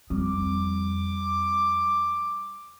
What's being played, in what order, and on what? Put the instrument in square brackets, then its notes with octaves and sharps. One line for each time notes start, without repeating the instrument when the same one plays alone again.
[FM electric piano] F2 [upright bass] G3 [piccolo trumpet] D6